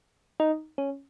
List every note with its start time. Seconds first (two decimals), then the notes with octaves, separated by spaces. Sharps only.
0.40 D#4
0.78 C#4